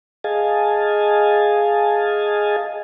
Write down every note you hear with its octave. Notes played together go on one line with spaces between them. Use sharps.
G#4 D#5 F5 G#5 A5